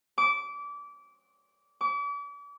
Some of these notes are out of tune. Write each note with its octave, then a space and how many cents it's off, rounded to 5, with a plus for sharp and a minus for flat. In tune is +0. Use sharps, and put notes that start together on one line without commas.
D6 -25
D6 -40